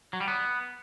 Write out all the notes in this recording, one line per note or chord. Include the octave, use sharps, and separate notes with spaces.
F#3
G3
B3